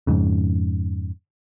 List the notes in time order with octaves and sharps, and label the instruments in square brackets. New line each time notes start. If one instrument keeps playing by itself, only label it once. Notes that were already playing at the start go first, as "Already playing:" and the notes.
[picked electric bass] F2 G#2 C#3